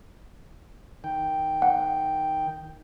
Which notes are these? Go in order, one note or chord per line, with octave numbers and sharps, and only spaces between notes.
D#3 G5
F#5